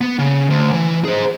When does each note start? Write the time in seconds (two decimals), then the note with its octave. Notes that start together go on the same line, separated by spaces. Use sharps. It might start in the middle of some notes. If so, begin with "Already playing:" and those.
0.01 B3
0.19 C#3
0.50 D2
0.72 E3
1.05 G#4 C5